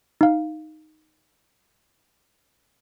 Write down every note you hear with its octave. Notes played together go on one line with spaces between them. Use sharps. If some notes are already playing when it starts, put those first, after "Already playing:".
D#4 F5